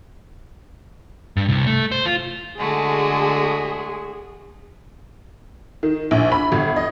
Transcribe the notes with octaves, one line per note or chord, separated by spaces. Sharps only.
G2
C2
A3
C5
F4
D3 G#3 A3 F#4 G#4
D#3
A#1
B5
G1
D#5